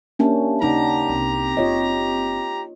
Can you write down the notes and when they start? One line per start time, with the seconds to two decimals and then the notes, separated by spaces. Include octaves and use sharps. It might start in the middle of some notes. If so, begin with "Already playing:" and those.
0.19 A#3 C#4 D4 G4 E5 A5
0.62 D#2 C#3 D#4 G4 D5 F#5 A5 A#5
1.09 C2 C4
1.57 F#1 C4 F4 C#5 D#5